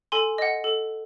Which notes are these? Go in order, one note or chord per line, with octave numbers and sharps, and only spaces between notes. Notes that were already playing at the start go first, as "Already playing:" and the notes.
A4 G#5 C6
D#5 F#5
A4